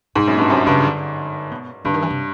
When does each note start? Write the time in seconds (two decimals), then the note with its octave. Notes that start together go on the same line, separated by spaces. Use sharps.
0.15 G#2 B2
0.27 F#2
0.33 G2 A#2
0.50 F#2 C3
0.66 G2 C#3
0.83 D3
1.51 B2
1.85 G2 D3
1.94 D#3
2.02 E3
2.10 C3